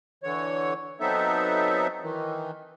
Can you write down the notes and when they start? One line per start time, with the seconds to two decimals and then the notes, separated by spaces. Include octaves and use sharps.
0.23 D3 E3 C#5
1.00 F#3 B3 C4 D#4 A4 E5
2.02 D#3 E3